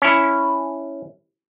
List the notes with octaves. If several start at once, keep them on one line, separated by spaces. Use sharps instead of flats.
C#4 E4